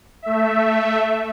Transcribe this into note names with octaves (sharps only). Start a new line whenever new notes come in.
A3 E5